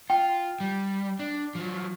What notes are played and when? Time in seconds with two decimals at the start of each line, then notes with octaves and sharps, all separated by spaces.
0.10 F4 G5
0.60 G3
1.19 D4
1.55 F3 F#3